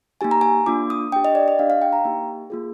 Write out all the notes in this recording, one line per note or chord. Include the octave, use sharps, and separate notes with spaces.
A#3 D#4 G4 G#5
A#5
G#5
A#3 D4 F4 D6
D#6
D4 G4 G5
D#5
D5
D#5
D4 G4 F5
F5
G5
A#5
A#3 D#4 G4
A#3 F4 G#4